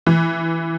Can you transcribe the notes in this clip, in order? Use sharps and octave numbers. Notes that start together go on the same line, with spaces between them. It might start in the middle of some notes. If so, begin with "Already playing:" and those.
E3